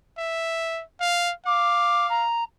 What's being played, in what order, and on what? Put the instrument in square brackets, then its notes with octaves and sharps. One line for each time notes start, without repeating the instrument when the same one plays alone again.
[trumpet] E5
F5
[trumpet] F5 [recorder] D6
[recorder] A#5